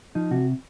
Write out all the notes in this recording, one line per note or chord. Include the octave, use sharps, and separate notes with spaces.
F3 D#4
C3 F#4